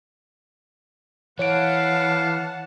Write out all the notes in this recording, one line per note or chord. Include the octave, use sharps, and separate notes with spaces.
E3 B4 C#5 F5 F#5 A5 D7